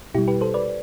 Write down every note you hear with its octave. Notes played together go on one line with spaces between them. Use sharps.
B2 G3 E4 G4
G4 B4
A4 C5
B4 D5